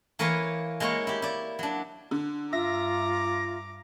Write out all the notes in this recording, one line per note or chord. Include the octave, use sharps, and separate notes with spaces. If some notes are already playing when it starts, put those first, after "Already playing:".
E3 A#3 A#4 B4 C#5 C6
G#3 A#3 E4 F4 C#5
E4 G4
E4 D5
F#3 D4
D3
G2 F4 E5 A#5 D6 A#6